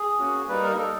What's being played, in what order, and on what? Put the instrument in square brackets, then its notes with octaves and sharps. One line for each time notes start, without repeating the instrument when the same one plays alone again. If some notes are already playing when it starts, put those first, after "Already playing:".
Already playing: [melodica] G#4
A#3 C#4 F#4
G3 A#3 D#4 B4
A#4
G3 A#3 D#4 A4